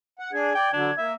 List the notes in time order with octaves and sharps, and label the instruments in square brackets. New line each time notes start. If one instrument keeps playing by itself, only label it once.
[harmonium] F#5
[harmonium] D4 G#4 [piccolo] G#6
[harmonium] D5 [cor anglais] G5
[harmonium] D3 F#3 [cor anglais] D4
[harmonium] A#3 [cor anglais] E5